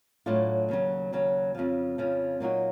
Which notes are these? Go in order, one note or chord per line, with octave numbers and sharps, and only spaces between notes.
A2 F#3 A3 D4 F4
D#2 C#3 F#3
D#2 C#3 F#3
F2 C#3 F3
F2 C#3 F3
A#2 F#3 A#3 D#4 F#4